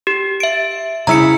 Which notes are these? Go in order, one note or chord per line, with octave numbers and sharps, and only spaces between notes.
G4
E5 D7
C#3 E4 A#5 E6 C#7